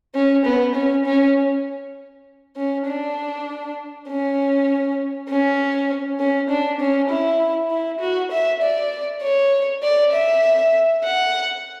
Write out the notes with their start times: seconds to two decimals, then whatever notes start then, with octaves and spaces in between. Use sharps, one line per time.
0.15 C#4
0.45 B3
0.75 C#4
1.05 C#4
2.56 C#4
2.87 D4
4.08 C#4
5.29 C#4
6.19 C#4
6.50 D4
6.80 C#4
7.10 E4
7.70 E4
8.00 F#4
8.32 E5
8.62 D5
9.22 C#5
9.83 D5
10.12 E5
11.03 F#5